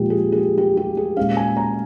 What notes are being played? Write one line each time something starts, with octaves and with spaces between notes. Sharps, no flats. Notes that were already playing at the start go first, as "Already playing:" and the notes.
Already playing: A#2 F3 G#3 D#4 G4 G#4
G#4
G#4
G4
G4
G4
G#4
A#2 G#3 C#4 F5
G#5
A#5